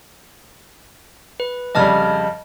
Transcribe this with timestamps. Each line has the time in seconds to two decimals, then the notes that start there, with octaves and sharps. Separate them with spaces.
1.40 B4
1.75 F2 C#3 G3 D#5 A5 F6